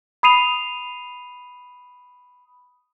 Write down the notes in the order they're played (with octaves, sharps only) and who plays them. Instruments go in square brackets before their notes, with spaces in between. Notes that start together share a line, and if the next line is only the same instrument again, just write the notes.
[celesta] B5 D#6 C7 D#7 F7